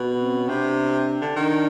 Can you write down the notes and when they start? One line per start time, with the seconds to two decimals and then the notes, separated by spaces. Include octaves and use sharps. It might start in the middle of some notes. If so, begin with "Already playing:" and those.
Already playing: B2
0.20 C4
0.35 C#4
0.48 C3 D4
1.21 D3
1.36 D#3 D4